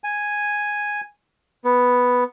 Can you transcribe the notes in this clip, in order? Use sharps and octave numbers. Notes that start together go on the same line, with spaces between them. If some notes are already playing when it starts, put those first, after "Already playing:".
G#5
B3